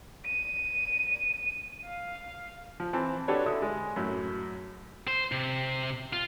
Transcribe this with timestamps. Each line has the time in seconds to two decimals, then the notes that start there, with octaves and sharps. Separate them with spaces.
0.26 D#7
1.85 F5
2.80 F3
2.93 E3 C4 A5
3.28 D4 F#4 G4 A4 B4 C#5
3.46 D3 E4 D#6
3.62 G#3
3.96 F#2 A2 F#3
5.08 C5
5.32 C3
6.13 F4